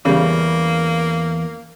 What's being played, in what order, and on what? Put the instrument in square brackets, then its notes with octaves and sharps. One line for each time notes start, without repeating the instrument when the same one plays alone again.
[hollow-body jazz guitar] E2 [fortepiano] C#3 G3 [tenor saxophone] A#3